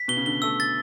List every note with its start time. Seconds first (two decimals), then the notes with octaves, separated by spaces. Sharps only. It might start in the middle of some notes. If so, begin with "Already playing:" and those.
Already playing: B6
0.08 B2 G7
0.17 C#3
0.26 D3 G7
0.42 A3 E6
0.60 A6